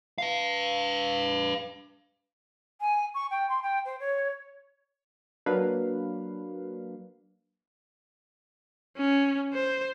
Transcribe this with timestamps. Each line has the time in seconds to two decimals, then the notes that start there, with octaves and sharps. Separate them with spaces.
0.18 B4 F5
2.81 G#5
3.14 C#6
3.31 G5
3.49 C6
3.63 G5
3.85 C5
4.00 C#5
5.46 F#3 A#3 D4 B4 F5
8.97 C#4
9.54 C5